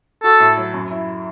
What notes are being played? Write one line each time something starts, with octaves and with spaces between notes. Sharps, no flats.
F#4 A4
A2
F#3
F#2
E4